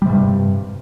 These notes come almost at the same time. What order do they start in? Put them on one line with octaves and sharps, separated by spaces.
G3 C3 G2